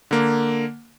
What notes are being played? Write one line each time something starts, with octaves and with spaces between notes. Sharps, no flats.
D3 A#3